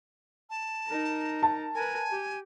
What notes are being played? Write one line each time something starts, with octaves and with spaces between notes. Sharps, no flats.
A5
D#4 A#4
A5
A#4 B4 G#5
G4